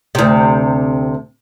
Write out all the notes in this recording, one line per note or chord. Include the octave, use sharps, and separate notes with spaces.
D2 C3